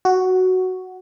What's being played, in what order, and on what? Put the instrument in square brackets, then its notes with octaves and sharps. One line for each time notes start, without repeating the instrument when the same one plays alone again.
[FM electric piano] F#4